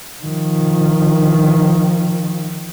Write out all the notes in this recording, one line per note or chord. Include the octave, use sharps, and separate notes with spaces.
D#3 F3